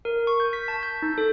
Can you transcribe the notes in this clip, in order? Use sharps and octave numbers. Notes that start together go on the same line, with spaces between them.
A#4
C#6
G6
B6
A5
G6
D#4
A4